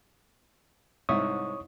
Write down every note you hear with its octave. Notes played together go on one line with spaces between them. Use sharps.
C2 G#2 C#5 E5 C#6 D#6